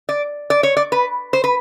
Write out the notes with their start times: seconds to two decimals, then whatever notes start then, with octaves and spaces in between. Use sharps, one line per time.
0.09 D5
0.50 D5
0.63 C#5
0.77 D5
0.92 B4
1.33 C5
1.44 B4